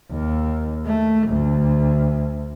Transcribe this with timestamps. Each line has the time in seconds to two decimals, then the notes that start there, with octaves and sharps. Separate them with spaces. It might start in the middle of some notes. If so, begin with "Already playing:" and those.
0.11 D#2
0.86 A3
1.27 D2